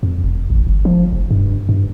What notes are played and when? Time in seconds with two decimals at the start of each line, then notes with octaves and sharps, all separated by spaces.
0.03 F2
0.24 F1
0.50 A1
0.67 G1
0.85 F3
1.13 F1
1.31 G2
1.69 G2